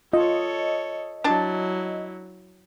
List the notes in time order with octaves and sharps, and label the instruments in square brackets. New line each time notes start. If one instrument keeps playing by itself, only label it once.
[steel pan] F4 [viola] A4 C#5 [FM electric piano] D#5
[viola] F#3 E4 [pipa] D4 A5